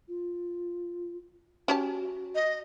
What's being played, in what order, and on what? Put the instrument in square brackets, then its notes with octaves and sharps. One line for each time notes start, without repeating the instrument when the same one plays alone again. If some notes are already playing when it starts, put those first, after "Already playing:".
[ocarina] F4
[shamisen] C#4 G4 A5 [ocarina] F#4
[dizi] D#5